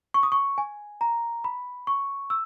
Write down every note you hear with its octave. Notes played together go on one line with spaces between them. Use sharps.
C#6
D#6
C#6
G#5
A#5
B5
C#6
E6